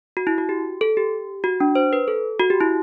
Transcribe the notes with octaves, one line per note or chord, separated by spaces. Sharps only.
F#4
E4
F#4
G4
A4
G4
F#4
D4
C5
B4
A4
F#4
G4
E4